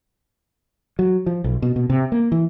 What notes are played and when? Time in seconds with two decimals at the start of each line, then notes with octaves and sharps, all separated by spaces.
0.99 F#3
1.26 F3
1.44 B1
1.62 B2
1.76 B2
1.90 C3
2.12 A#3
2.32 E3